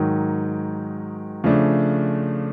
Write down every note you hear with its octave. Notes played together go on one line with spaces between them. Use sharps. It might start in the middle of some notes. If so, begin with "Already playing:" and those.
Already playing: G#2 D#3 F#3
C#3 F3 A3 D4